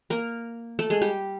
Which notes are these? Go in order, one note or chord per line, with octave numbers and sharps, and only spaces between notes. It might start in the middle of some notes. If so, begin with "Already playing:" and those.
A#3 A#4
A3 A4
G#3 G#4
G3 G4